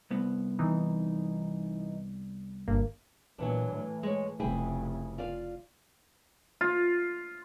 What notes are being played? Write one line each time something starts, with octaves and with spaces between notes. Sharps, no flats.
C2 B3
E3 D#4
G1 G2 A#3
A#2 E3 F#3 B3 D4
A2 E3
G#3 C#5
F1 C#3 E4 G4 G#4
F4 D5 F5
F4